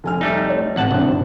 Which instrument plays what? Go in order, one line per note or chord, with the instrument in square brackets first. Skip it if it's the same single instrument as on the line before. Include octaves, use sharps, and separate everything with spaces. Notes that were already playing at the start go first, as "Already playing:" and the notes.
[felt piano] F1 G#5 F6
[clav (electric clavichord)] G3 A3 D#4
[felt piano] C#5
[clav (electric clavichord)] A1 F#5 A5 [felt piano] C3
[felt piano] G#1 G2 [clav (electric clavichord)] E2 [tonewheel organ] C3